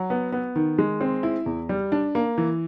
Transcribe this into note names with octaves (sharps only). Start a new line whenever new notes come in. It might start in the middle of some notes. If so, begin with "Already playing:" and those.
Already playing: F#3
B3
B3
D#3
G#3
C4
E4
E2
G3
D4
A#3
E3